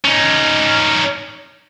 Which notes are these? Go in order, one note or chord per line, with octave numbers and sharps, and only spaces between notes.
C#4 D#4